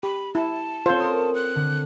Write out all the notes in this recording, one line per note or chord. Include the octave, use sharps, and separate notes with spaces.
G4 B5
E4 A5
C4 F4 A4 C5 C#5
A#4 C6 D#6
F#6
D3